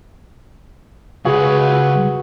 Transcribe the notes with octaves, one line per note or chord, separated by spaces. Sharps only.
C#2 F#4 G#4 B4